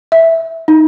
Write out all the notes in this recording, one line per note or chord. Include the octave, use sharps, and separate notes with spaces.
E5
D#4